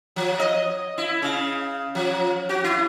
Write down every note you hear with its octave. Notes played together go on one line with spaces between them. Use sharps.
F3
D#5
E4
C#3
F3
F#4
E4